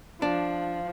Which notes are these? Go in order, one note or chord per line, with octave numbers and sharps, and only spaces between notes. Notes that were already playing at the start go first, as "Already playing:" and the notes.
F3 D4